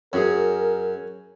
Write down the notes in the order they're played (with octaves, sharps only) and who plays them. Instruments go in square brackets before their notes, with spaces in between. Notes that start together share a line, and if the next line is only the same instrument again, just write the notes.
[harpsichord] F#2 [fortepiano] C#4 F#4 G#4 [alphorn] A#4